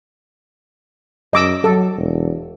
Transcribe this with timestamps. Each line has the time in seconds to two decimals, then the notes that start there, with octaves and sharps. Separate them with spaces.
1.33 F#2 D#5 D6 E6
1.64 F#3 A4
1.96 E1